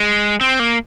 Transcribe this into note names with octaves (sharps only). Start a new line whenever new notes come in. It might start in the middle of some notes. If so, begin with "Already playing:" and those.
Already playing: G#3
C4
A#3